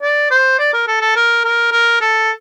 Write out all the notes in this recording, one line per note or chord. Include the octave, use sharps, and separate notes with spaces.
D5
C5
D5
A#4
A4
A4
A#4
A#4
A#4
A4